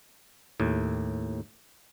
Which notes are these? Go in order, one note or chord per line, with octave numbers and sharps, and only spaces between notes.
D#2 A2